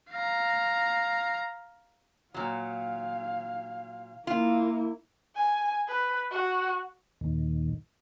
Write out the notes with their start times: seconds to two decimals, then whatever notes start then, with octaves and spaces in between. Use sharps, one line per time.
0.11 F5 A#5
2.34 A#2 F#3 F5
4.27 A#3 E4 F4
5.35 G#5
5.87 B4
6.31 F#4
7.21 D#2 A#2 D#3